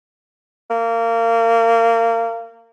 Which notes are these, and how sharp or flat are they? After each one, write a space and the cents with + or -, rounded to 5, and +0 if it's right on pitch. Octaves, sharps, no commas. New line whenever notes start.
A#3 -25